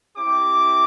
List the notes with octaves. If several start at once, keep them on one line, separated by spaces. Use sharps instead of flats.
C4 E4 G4 D6